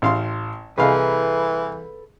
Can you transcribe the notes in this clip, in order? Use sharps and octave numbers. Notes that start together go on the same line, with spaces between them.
A1 F5 C6
C2 E3 G#4 A4 B4 D#5 F5 G#5